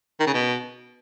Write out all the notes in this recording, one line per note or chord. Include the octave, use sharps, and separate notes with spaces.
D#3
C#3
B2